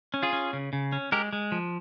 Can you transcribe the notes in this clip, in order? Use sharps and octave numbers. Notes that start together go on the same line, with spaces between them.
C#4
F4 G#4
C#4
C#3
C#3
C#4
G#3 G4 A#4
G#3
F3